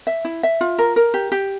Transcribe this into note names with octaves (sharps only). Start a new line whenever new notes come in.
E5
E4
E5
F4
A#4
A#4
G4
G4